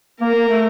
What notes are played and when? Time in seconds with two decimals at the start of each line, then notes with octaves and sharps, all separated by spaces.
0.21 A#3 A#4
0.35 A#3
0.49 A3